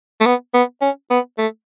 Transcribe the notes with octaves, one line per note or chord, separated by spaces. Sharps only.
A3
B3
B3
C#4
B3
A3